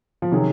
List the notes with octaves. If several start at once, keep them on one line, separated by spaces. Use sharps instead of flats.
F3
C3 D#3 F#3 C#4 G#4